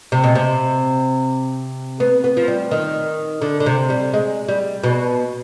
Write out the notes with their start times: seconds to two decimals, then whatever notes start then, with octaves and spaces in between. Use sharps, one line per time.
0.12 C3
0.24 B2
0.35 C3
2.00 B3
2.24 B3
2.37 F3
2.48 G3
2.71 D#3
3.42 D3
3.60 D3
3.66 C3
3.90 G3
4.14 G#3
4.49 G3
4.83 B2